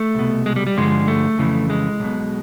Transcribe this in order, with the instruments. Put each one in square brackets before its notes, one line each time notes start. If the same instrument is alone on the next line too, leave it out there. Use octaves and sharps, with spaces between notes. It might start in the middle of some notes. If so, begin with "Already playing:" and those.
Already playing: [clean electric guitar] A3
C2 B2
G#3
G3
G3
G2 D3 F3 G#3
A3
F2 C#3 E3
G#3
B1 B2